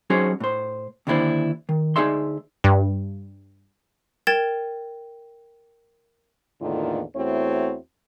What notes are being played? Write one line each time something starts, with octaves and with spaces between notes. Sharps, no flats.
F#3 C#4 D#4 F#4 G#4 C5
A2 C5
D#2 D3 D4 E4 C5 D5
D#3
D2 D#4 G#4 D5 E5 C6
G2
A#4 G5 G#6 A6 E7
E2 A2 D3 D#3 A#3 F4
E2 A3 C4 E4 F#4 C#5